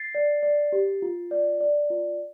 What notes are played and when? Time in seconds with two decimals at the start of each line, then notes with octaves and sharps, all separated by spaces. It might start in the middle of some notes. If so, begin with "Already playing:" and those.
Already playing: A6 C7
0.15 D5
0.43 D5
0.73 G4
1.02 F4
1.31 D5
1.61 D5
1.90 F4